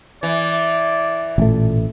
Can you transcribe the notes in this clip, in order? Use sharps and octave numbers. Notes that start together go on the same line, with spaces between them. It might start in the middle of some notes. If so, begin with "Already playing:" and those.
E3 D5
A1 A#2 A3